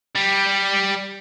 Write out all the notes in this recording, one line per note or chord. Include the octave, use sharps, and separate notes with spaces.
G3